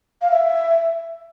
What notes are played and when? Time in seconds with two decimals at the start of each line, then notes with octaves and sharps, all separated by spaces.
0.22 F5
0.31 E5